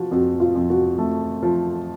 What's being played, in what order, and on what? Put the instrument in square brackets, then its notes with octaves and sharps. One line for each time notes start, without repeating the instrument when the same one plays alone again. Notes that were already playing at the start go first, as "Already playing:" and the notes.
Already playing: [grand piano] F3 [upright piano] F#4
[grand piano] F2 [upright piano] F#4
[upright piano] F4
[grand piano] F2
[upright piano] F#4
[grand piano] A3
F3